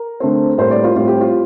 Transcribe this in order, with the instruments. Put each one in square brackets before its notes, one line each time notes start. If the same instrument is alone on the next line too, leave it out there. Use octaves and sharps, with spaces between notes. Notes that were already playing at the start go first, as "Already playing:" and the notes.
Already playing: [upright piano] A#4
D3 A3 C4
A2 G3 A#3 C5
D5
F4
A2 G3 C4 F4
G4
F4